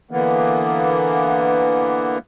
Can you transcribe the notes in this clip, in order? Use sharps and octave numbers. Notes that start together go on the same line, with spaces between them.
D3 E3 A#3 B3